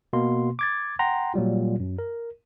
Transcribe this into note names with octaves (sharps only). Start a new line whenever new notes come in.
B2 A#3 C6
D6 G#6 A6
F#5 G5 A#5 C6
A#2 F#3 G3 F4
F#2
A#4